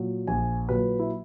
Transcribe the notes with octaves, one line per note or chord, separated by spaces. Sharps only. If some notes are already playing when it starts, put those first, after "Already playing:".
Already playing: A#2 F#3
A#1 G#5
A#2 F#3 B4
E4